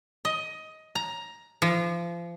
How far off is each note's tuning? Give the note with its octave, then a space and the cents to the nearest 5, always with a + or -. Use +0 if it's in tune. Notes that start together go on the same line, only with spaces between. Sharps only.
D#5 +15
A#5 +10
F3 -30